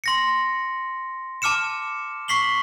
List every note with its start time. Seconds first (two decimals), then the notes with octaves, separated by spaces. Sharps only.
0.04 C6 A#6 C#7
1.42 A5 D6 F6 C#7 E7
2.28 C#6 B6 C7 F#7 G7